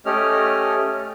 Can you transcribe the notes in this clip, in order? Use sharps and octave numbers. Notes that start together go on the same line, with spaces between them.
A3 C#4 G4 D#5 F6